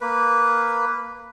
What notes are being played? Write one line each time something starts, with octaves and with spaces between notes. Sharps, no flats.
A#3 B4